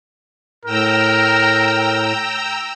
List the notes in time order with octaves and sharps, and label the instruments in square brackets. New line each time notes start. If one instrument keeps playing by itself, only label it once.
[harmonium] A2 [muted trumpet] A#4 [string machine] G5 A#5 E6